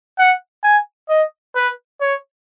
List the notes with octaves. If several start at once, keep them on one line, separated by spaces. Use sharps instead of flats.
F#5
G#5
D#5
B4
C#5